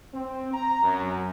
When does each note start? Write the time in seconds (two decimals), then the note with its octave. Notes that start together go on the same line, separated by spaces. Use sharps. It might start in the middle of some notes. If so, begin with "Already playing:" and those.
0.14 C4
0.53 A#5
0.83 F#2